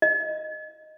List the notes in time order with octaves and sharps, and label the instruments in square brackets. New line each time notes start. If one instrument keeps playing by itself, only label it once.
[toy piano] D#5